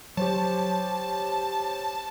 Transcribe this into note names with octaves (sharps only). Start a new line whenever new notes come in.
F#3 G4 C5 C#5 A5